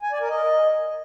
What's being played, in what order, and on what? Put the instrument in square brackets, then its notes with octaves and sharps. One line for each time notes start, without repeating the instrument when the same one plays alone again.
[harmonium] G#5
D5
A#4
D#5